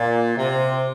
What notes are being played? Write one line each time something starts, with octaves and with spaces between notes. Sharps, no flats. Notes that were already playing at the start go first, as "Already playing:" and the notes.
Already playing: A#2
C3